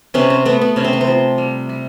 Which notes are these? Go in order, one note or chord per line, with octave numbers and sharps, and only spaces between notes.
C3 B3 C#4
C4
A3 B3
B3
C3 C#4
C4
B3
C4
F3
G3
G3